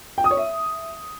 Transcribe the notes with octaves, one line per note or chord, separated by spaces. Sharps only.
G5
D#6
C#5
E5